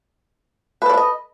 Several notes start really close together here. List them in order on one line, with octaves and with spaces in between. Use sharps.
B4 A4 D5 D4 D#5